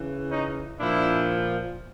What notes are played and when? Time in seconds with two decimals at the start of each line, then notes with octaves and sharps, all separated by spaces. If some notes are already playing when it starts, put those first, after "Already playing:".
Already playing: C#3 E3
0.30 C#4 D#4
0.79 A#2 F3 D4 E4